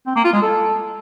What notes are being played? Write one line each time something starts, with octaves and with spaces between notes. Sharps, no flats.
C4
A#3
F4
G#3
A4